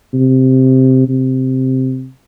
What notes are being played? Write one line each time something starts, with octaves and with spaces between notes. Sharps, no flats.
C3
C3